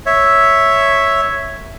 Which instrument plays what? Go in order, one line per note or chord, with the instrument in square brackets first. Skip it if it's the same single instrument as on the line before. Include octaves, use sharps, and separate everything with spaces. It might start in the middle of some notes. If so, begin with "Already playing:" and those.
[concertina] C#5 E5